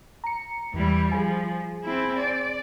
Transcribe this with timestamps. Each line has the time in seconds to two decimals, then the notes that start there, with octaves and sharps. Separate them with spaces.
0.24 A#5 C#7
0.74 E2 E3 G3
1.12 F3 G#4 G#5
1.84 C4 E4
2.18 D5